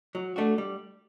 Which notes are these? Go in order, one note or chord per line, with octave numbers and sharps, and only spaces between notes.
F#3
A3 D4 F#4
G3